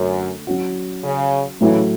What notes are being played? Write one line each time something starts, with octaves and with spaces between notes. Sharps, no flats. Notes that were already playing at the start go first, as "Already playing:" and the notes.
Already playing: F#2 D3 A3
F#3 C#4 F#4
C#3
A2 C#3 E3 F#3 A3 E4